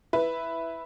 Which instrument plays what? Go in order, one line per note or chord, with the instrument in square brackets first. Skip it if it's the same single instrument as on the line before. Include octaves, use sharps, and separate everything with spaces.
[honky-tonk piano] E4 B4